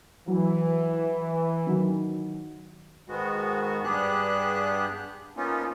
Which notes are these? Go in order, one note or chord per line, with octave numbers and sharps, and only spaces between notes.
E3 F#3
D#3 F#3
G#2 D#3 G#3 B3 F#4
G2 B3 D4 G4 G#4 F#6
F3 A#3 B3 C#4 D#4 F4